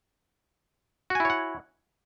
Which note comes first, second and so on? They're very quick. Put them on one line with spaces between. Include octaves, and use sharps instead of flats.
F#4 G#5 E4 C#5 F#5